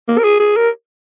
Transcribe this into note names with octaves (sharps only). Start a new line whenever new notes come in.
A#3
A#4
G#4
G#4
A#4